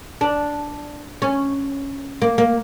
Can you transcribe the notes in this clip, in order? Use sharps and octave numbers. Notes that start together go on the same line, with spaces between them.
D4
C#4
A#3
A#3